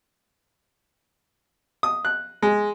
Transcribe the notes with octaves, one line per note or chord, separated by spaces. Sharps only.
D#6
F#6
G#3